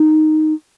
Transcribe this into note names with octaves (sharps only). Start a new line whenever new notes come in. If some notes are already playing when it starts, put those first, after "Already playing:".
Already playing: D#4